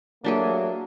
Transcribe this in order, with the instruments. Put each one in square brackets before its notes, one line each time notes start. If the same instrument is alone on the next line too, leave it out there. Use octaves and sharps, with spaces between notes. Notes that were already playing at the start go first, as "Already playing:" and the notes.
[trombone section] F#3 A3 A#3 [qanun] D4 G4 G#4